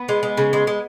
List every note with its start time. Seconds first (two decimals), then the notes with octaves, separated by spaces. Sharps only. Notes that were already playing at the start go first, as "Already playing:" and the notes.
Already playing: B3
0.09 G#3
0.23 G#3
0.37 C#3
0.53 G#3
0.67 G#3